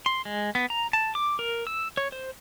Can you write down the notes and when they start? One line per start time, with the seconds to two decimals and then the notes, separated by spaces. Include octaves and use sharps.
0.06 C6
0.25 G#3
0.55 B3
0.70 A#5
0.93 A5
1.15 D6
1.39 A#4
1.67 E6
1.97 C#5
2.12 C5